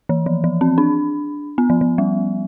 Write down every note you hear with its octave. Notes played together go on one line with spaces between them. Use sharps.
E3
F3
F3
C4
D4
B3
F3
F3
G3